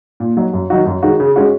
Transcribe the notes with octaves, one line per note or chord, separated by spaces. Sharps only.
A#2
F#3 D#4 F#4
F#2
D#3 F#3 D#4 F#4
F#2
D#3 G#3 D#4 F#4
C#3
G#3 C#4 F#4